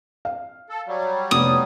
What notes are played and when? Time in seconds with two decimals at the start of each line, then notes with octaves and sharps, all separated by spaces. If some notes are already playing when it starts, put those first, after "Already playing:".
0.25 F5
0.69 A4
0.87 F#3 G3
1.31 F1 B3 D#6